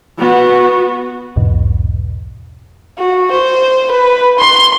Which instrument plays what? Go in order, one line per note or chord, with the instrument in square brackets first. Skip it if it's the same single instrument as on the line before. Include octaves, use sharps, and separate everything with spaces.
[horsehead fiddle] B3 F#4
[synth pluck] B1 E2 G#2 B2 E3
[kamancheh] F#4
C5
B4
C6